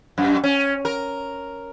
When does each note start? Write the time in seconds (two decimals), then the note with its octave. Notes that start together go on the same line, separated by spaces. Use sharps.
0.18 F#2
0.44 C#4
0.85 A#4